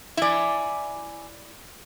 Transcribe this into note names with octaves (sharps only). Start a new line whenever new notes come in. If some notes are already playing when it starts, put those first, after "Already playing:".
E4 D5 E5 G#5